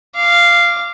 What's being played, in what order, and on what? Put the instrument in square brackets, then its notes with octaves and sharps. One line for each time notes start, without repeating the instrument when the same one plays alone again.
[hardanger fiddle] F5 D6